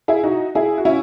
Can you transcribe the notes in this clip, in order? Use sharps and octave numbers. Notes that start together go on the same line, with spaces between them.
E4 G#4
D#4 F#4
E4 G#4
F#4
C#4 E4